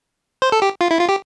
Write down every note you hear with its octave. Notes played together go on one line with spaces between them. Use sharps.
C5
A4
G4
F4
E4
F4
G4